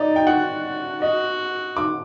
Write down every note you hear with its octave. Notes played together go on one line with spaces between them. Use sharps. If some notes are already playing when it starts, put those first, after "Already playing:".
Already playing: D#4 D5
G5
F#4 F#5
F#4 D#5
D6